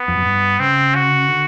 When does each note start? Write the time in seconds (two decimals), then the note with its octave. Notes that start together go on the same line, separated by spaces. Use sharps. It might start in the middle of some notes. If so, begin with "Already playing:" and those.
Already playing: B3
0.08 F2
0.17 F#2
0.25 G2
0.60 C#3 C4
0.95 F#4
1.29 D3